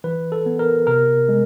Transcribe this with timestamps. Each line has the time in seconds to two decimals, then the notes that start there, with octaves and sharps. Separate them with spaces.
0.04 E3 B4
0.32 A4
0.46 B3
0.59 A#4
0.87 C3 A#4
1.29 G#3